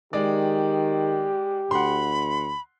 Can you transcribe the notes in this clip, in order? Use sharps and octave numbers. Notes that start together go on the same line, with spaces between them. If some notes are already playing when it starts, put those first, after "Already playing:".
D#3 G#3 G4 D5
D2 F#5 B5 C6